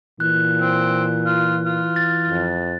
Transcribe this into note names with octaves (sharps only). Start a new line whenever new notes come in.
A#2 E3 F#6
C4
F4
F4
A6
F2